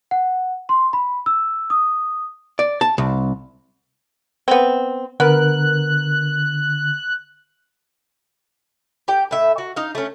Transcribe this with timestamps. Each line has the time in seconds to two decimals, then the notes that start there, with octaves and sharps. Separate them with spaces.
0.11 F#5
0.69 C6
0.93 B5
1.26 E6
1.70 D#6
2.59 D5
2.81 A5
2.98 C2
4.48 B3 C4
5.20 D3 B3 A#4 F#6
9.08 G4 G5
9.31 A2 E5
9.58 F#4
9.76 D#4 F5
9.95 A3 C#4